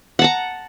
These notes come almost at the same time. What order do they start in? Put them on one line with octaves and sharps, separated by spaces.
F#5 A5 A#5